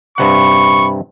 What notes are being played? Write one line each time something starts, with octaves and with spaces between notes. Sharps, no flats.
G2 C3 F#5 B5 C#6